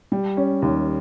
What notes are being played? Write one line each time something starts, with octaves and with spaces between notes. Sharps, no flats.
G3
C#4
D#2